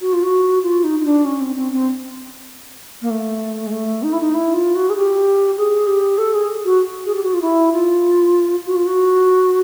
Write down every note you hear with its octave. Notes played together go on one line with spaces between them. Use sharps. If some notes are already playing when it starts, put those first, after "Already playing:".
F#4
F4
F#4
F4
D#4
D#4
D4
C#4
C4
C4
C4
A#3
A3
G#3
A3
D#4
E4
D#4
E4
F4
F#4
G#4
G4
G#4
G4
A4
G#4
F#4
G#4
G4
F#4
F4
E4
F4
F#4
F4
F#4